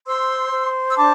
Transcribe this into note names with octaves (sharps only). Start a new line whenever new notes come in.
C5 C6 E6
C5
E6
D4 A5 D6